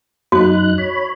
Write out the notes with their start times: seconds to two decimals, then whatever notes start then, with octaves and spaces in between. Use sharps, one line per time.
0.32 F#2 D#4 F#4 F#6
0.78 C#5 B5